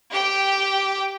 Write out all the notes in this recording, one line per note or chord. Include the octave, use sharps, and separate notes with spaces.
G4 G5